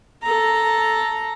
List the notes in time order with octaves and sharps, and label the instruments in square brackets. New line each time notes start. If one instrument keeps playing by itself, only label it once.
[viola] A4 A#5